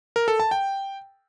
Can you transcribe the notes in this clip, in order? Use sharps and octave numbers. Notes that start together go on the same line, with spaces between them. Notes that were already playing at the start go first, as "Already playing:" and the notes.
A#4
A4
A5
G5